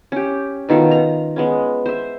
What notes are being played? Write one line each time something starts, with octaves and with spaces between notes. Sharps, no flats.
C#4 G4
B2 D#3 F4 A4
A#5
G#3 B3 C#4
C5 E5